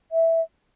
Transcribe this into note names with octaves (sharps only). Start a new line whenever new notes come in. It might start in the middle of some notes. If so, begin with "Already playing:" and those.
E5